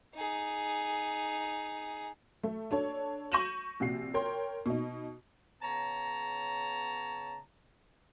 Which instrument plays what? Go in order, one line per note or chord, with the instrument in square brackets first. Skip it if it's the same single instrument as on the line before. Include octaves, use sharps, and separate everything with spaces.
[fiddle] D#4 G#4
[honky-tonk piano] A3
D4 A4 C#5
C#6 G6 A#6 D#7 E7 F#7
A#1 C3 F#4 C7
A#4 C#5 G5 C6
B2 D#4
[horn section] C#3 B3 C#5 A5 A#5